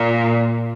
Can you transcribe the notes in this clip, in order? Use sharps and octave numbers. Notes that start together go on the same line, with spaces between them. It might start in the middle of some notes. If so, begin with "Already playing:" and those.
Already playing: A#2